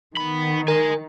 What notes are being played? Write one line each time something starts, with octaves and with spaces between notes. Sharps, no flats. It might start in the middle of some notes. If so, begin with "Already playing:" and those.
D#3 B3 B5
A#4 D#5 G#5